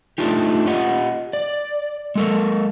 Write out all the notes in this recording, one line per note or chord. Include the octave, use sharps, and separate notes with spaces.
A3 D4 D#4 F4 G4
F4 G4 D#5 F#5
D5
G#3 A4 A#4